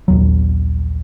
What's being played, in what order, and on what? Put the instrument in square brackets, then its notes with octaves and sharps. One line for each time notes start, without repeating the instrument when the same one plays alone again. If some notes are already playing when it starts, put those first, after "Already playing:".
[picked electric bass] A#1 D#2 F#3